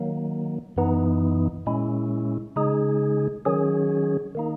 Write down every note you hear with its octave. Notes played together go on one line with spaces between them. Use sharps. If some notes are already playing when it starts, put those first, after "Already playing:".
Already playing: D#3 F#3 A#3
F#2 E3 B3 D#4
A#2 G#3 C#4 E4
C#3 G#3 D#4 G#4
D#3 F#3 C#4 G#4
D#3 A#3 D#4